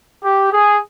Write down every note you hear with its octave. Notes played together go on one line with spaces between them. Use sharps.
G4
G#4